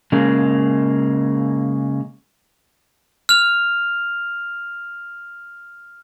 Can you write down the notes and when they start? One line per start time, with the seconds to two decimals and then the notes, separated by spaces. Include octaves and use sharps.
0.12 C#3 G#3 A#3
3.29 F6 F7